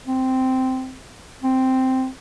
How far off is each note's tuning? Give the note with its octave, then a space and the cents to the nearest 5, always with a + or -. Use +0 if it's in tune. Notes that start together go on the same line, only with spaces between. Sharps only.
C4 -10
C4 -5